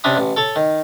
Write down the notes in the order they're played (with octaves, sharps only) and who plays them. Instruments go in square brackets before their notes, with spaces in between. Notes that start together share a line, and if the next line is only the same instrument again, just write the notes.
[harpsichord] C3 C#4 D4 B5 D#6
A1
A4 C#5 A5
D#3